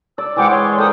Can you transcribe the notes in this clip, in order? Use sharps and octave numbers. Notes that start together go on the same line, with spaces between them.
D5 E6
E3 G#3 C5 F#5 G5 D6
C#5 C6
A4 A#4 F#5 G5 D#6